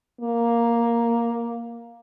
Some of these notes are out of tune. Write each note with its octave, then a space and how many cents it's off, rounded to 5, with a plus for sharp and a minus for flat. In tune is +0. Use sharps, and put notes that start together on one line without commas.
A#3 +5